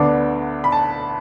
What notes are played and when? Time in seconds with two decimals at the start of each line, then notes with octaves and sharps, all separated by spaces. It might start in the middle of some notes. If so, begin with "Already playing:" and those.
Already playing: D2 D3 B3 D4 D6
0.64 B5
0.72 A5